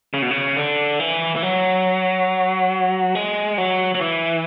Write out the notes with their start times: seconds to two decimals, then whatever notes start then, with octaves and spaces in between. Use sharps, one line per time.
0.14 C#3
0.22 B2
0.31 C#3
0.57 D3
1.00 E3
1.36 E3
1.43 F#3
3.15 G#3
3.58 F#3
3.95 F#3
4.01 E3